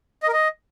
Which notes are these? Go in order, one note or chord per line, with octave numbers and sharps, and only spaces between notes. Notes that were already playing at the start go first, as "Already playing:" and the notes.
D#5
A#4
D#5